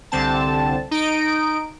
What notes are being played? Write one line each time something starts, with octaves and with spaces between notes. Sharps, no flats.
C2 D3 C4 A5
D#4 D7